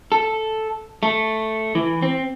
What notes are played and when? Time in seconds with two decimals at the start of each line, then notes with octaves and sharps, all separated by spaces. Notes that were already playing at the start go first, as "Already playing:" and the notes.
0.12 A4
1.03 A3
1.75 E3
2.02 C4